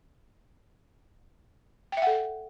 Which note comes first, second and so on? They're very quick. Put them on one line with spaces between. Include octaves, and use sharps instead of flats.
G5 E5 F#5 A4